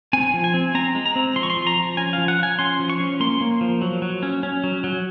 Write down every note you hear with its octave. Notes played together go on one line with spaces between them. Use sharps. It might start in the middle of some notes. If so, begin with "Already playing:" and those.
C4 G#5
F3
G#5
C4
C4 A#5
G#3
A#5
C4
F3 C6
C#6
C6
F3
A#5
F3
C#4 G#5
F5
F3
F#5
F3 G#5
C#4 C6
F3
C#6
C#4
A#3 C6
A#3
F3
F#3
F#3
C#4
C#4
F#3
F#3